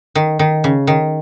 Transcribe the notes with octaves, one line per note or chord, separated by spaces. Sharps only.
D#3
D#3
C#3
D#3